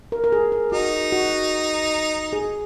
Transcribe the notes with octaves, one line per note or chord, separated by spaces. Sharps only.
A#4
A#4
G#4
A#4
D#4 F#4
F#4
G#4